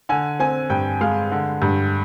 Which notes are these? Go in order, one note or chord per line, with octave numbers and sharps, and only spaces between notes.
D3 G#5
C4 G#5
G2 G5
G#3 F5
D3
G2